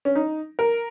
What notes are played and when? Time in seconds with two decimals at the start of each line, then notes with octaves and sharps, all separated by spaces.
0.05 C#4
0.15 D#4
0.59 A#4